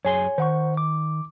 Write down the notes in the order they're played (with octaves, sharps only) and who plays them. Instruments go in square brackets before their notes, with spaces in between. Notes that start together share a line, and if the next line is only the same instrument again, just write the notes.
[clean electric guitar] F#2 G#4 C6 [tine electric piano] C#5 G#5
[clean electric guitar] D#3 [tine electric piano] C5 F#5 C#6
[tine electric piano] D6